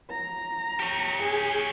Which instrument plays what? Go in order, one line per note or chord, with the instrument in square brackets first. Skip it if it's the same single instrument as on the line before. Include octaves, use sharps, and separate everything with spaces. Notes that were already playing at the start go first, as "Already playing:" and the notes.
[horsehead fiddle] A#5
[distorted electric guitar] G4 C#5
[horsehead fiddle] G#4